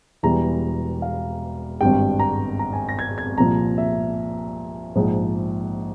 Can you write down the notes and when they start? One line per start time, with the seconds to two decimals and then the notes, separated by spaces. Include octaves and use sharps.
0.23 E1 E2 E3 G3 A#5
1.02 F5
1.81 G#1 G2 G3 G5
2.19 A#5
2.59 A#5
2.73 G#5
2.89 A#6
2.99 G#6
3.18 G#6
3.37 C2 A#2 F3 A#5
3.78 E5
4.96 A#1 G#2 F3